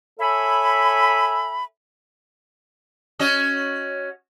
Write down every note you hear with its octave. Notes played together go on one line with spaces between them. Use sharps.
A4 C#5 E5 G#5 B5
C#4 F#4 D#5